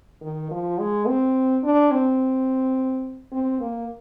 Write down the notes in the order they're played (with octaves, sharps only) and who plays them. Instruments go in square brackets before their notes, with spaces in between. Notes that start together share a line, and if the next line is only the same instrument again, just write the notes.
[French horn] D#3
F3
G#3
C4
D4
C4
C4
A#3